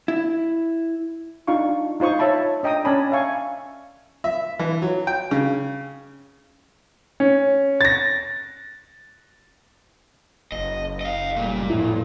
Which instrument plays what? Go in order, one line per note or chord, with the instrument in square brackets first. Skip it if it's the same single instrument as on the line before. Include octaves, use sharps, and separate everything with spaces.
[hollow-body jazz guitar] E4
[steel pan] D4 D#4 F4 F5 C#6
D#4 F4 C5 C#6 D#6
C#5 E5 A5 B5
D4 D#5 G5 A#5 D#6
C#4 A#4 D5 G#5 A5 B5
E5 F5 G#5 C#6
[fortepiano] E5
E3
F#3
G5
C#3
[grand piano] C#4
A6 A#6
[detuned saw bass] F#1 [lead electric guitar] D#5
[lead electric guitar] D#5 F5
[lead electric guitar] A#2 [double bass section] G3 A3
[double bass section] F2 [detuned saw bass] A2 [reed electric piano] E4